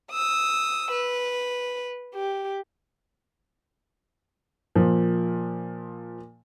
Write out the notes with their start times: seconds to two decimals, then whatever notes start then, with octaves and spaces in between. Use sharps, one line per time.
0.12 D#6 E6
0.92 B4
2.14 G4
4.76 A#2 F3